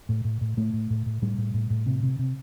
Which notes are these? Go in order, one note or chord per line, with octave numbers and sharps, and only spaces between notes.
A2
A2
A2
A2 A3
A2
A2
A2
A2 G3
A2
A2
A2
C3
C3
C3